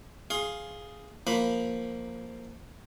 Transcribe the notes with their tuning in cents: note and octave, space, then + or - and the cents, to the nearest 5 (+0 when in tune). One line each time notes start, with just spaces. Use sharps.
G#4 +0 F5 +0 C6 +25
F3 +0 A#3 +0 B5 +0